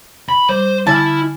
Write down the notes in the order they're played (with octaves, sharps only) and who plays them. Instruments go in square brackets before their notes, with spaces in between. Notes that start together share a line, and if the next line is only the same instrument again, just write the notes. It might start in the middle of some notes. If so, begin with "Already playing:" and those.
[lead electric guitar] B5
[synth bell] G3 [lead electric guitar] C5
[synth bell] D3 G#5 F6 [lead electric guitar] E4 [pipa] A5